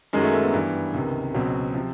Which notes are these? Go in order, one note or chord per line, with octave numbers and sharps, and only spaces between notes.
F#2 D#3 F#3 G#3
A3
A3
B3
G2 E3
C#2 C3 D#3
C#2 B2 F#3 C4
C3 F3